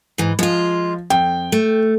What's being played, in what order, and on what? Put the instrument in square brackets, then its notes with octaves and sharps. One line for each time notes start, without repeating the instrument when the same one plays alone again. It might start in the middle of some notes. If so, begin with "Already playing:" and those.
[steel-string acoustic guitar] G#2 E3
[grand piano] F3 [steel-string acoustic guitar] G#3 F4
[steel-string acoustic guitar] F2 [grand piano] G5
[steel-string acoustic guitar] A3